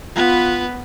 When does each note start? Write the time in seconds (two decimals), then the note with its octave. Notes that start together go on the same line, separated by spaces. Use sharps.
0.15 B3 F4 B4